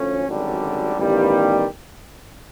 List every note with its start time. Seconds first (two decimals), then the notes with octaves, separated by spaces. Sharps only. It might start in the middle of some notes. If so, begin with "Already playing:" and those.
Already playing: D2 F3 A3 C#4
0.25 G#1 F#2 D3 G3
0.96 A1 G2 D#3 G3 B3